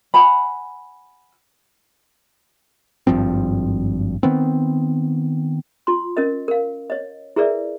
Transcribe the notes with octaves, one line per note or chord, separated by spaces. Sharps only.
F#5 G#5 B5
G#1 G2 F3 C4
D#3 B3 C4
F4 C6
C#4 A#4 D#5
A#4 F5
C#5 D#5
E4 G#4 A#4 B4 D5 E5